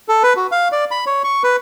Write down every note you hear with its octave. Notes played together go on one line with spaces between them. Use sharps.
A4
B4
F#4
F5
D5
B5
C#5
C#6
B4